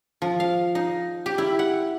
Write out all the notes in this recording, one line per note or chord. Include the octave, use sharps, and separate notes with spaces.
F3
F5
D#4
G4
E4
F#5